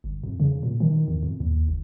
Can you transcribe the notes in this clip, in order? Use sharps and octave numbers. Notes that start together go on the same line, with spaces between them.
G1
F2
C#3
A#2
D#3
E2
F2
D#2
F#1